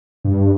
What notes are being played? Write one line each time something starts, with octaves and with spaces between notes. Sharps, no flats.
G2